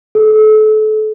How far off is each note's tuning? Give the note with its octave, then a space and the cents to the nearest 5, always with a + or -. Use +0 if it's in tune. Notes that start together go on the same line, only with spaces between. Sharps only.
A4 -35